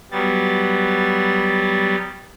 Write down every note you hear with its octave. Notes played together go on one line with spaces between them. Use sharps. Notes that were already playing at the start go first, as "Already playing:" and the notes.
F#3 G3 B3 A6